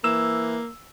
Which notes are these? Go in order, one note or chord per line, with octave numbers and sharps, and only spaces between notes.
E3 A#3 E6